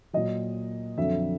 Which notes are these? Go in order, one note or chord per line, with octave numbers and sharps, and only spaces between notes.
A#2 F#3 D#5
F2 D3 F#3 E5